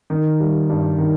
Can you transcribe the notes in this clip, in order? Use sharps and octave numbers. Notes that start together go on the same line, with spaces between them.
D#3
G3
G2
D#3